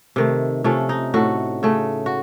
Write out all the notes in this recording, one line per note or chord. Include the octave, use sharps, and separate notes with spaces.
C3 D#3 A3
C3 F3 A3 C#4
D#4
A2 A3 F#4
C#3 A3
F#4